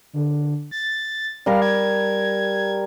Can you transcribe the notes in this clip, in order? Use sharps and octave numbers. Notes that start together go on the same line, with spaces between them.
D3
A6
G3 A#4 F5 A5
G#6